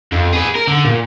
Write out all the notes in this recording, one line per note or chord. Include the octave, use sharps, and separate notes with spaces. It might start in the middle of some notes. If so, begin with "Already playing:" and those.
F2
G#4 B4
A#4
D3
A#2